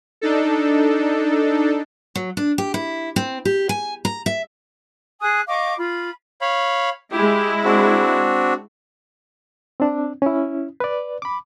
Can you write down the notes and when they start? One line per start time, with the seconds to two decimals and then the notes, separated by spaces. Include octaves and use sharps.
0.21 D4 D#4 A4
2.16 F#3
2.37 D4
2.58 G4
2.74 E4
3.16 C4
3.45 G4
3.69 G#5
4.05 A#5
4.26 E5
5.20 G#4 G#5 D#6 F#6
5.46 D#5 F5 C#6 D6
5.76 F4 B5
6.41 C#5 F5 B5
7.12 G#3 E4 G4
7.65 C4 D4 F#4
9.80 C4 D4
10.22 C#4 E4
10.80 B4 D5
11.22 B5 D6